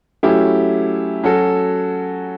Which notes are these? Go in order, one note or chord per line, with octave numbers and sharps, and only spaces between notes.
F#3 A3 C#4 E4 G4
F#3 C#4 F#4 A4